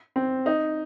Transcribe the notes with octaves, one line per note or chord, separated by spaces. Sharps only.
C4
D#4